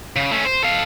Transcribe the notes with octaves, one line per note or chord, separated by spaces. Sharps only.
C#3
A3 C#4
C5
A4 F5